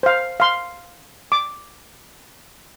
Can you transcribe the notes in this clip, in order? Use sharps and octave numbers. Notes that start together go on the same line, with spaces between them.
C5 F5
F5 C6
D6